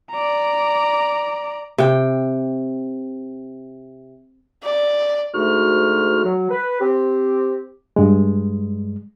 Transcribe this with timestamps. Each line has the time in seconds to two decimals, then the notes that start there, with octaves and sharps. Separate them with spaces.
0.11 D5 A#5
1.78 C3 G5
4.63 D5
5.34 D2 G#2 A3 F#4 F6
6.25 F#3
6.50 B4
6.81 C4 G4
7.96 G2 G#3